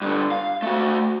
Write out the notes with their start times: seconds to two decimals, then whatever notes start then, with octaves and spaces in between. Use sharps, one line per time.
0.02 G2 D3
0.32 F5
0.62 A3 F#4